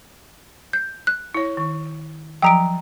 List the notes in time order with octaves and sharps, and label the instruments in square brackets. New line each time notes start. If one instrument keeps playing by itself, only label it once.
[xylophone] G6
F#6
[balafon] E4 C#5
D#3
[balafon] F3 F#3 [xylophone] G5 A#5 D7